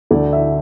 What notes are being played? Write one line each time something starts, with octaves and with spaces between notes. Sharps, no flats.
D2 D3 A3 D5
E5